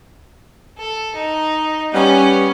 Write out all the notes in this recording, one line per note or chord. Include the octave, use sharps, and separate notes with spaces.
A4
D#4
G3 B3 C#4